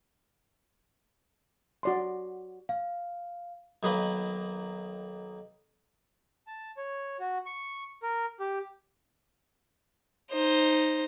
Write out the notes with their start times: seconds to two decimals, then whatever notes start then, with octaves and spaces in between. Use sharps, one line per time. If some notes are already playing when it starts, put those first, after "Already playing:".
1.83 F#4 D5 C6
2.69 F5
3.83 B1 D#3 A#3 B4
6.47 A5
6.77 C#5
7.20 F#4
7.46 C#6
8.03 A#4
8.40 G4
10.32 D#4 C5